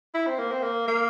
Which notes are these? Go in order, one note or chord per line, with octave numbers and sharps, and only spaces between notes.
E4
C4
A#3
C4
A#3
A#3